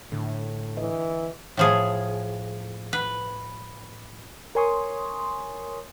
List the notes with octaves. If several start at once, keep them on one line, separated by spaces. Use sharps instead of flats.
A2 D3
E3 D#5
A2 F3 G#4
B4
A#4 C#5 G#5 C6 C#6 D#6